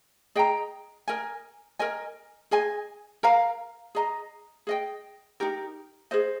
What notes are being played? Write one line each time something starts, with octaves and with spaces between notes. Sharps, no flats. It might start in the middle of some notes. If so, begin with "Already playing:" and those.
G#4 D#5 G5 A#5
A#4 D#5 G#5
A#4 D#5 G#5
G#4 D#5 G#5
A#4 F5 A#5
G#4 D#5 A#5
G#4 D#5 G5
D#4 G4 A#4
G#4 C5 D#5